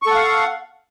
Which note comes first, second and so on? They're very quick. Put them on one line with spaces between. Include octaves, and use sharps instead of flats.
C#6 A4 F#5 F5